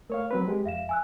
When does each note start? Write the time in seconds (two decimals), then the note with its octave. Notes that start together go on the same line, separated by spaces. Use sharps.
0.10 A3 A#4 C#5 F5
0.31 F#3 C4 B4
0.48 G#3 G4
0.65 F2 E5 F5 E7
0.89 G#5 E6 F#6